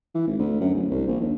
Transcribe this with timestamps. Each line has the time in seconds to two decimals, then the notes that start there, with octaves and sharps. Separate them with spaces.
0.15 E3
0.27 G#1
0.39 D2
0.61 F#2
0.74 D1
0.90 C2
1.07 A#1
1.21 D#2